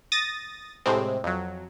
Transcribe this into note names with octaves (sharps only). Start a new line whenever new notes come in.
D#6 A6 A#6
A2 C3 G#3 C4
F2 F#3